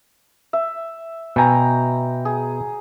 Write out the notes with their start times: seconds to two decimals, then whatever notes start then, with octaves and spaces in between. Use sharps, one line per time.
0.53 E5
1.36 B2 G5 G#5 A#5
2.25 G#4